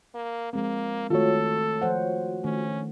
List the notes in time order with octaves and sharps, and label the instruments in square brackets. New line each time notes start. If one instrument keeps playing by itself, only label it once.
[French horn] A#3
[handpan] F3 G#3 C4 [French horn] A#3
[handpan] D#3 A3 [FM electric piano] F4 F#4 C#5 [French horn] A4
[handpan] F3 C5 F#5
[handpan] D#3 A3 D4 [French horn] C#4